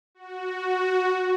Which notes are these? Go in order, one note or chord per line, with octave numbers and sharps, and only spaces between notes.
F#4